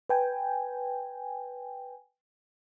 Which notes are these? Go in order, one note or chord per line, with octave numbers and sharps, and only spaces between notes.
B4 G5 G#5